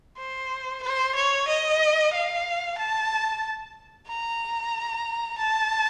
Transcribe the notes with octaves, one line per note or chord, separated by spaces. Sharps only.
C5
C5
C#5
D#5
F5
A5
A#5
A5